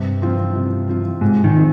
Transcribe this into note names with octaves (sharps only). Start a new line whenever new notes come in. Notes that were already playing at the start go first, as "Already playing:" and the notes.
Already playing: G2 C3
F3 C4 F4
C3
F3 C4 F4
G#2 C3
D#3
F3 C4